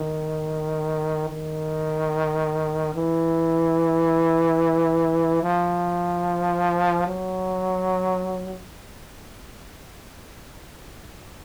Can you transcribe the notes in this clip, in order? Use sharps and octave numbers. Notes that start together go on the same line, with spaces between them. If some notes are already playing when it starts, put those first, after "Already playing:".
Already playing: D#3
D#3
E3
F3
F#3